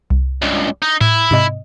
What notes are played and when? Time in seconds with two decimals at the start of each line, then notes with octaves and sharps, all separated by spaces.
0.10 C2
0.42 C#2 G2
0.82 D#4
1.01 A2 E4
1.31 G#2 C3 D#5